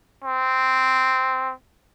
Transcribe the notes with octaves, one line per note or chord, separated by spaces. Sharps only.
C4